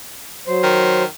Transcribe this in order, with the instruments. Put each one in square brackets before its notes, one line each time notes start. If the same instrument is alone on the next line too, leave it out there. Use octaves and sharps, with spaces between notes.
[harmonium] F#3 C5
[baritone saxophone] D#3